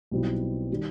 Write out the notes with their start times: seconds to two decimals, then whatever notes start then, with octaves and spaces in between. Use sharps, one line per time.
0.11 B1 B2 G3 C4 E4
0.72 D#3 G3